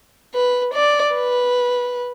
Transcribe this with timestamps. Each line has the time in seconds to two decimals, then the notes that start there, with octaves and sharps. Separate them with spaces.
0.34 B4
0.74 D5
1.14 B4